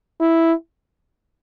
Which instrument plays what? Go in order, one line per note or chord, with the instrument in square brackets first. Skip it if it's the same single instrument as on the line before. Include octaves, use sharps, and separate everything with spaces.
[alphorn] E4